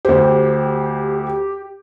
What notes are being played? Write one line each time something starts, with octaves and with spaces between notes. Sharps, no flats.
D2 G4 C5